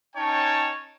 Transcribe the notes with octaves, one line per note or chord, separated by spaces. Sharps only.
C#4 D#4 C#5 G5 A5